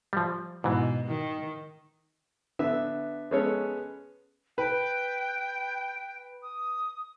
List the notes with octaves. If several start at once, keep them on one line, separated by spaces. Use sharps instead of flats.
F3 G3
G#2 B2 E3
D#3
D3 B3 E5
G#3 B3 C#4 A4 C#5
B4 G5
D#6